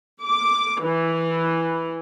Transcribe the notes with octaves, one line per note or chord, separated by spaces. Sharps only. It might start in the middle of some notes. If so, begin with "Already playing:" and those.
D6
E3